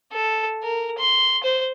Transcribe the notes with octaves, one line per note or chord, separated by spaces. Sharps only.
A4
A#4
C6
C5